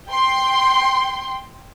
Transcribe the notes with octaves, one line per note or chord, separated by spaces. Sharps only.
G5 C6